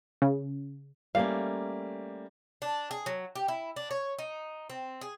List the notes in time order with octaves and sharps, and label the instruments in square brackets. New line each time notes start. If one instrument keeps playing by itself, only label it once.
[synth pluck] C#3
[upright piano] G3 A#3 [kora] A3 C#4 [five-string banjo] F5
[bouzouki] D4
G#4
F#3
G4
E4
D4
C#5
D#4
C4
G#4